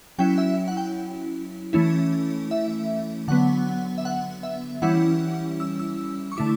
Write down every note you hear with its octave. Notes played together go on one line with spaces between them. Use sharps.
F#3 C#4 E4 G5
E5
F#5
G5
E3 A3 C#4 E4
E5
D3 F#3 B3 F#5
E5
F#5
E5
E3 G3 C#4 E4 F#5
E6
E6
C#6
D3 A3 E4 D6